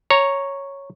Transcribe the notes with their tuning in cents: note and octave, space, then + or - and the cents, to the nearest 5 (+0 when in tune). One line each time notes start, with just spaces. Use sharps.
C#5 +0 A#5 +0